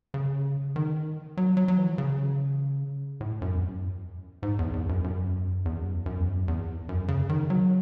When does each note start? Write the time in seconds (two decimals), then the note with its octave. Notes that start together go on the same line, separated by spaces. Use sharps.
0.14 C#3
0.76 D#3
1.37 F#3
1.57 F#3
1.68 F#3
1.78 E3
1.98 C#3
3.21 A2
3.42 F#2
3.54 E2
3.62 F#2
4.43 G#2
4.59 E2
4.73 E2
4.89 F#2
5.04 F#2
5.65 E2
5.80 F#2
5.93 E2
6.06 F#2
6.20 E2
6.34 F#2
6.48 E2
6.89 F#2
7.08 C#3
7.29 D#3
7.50 F#3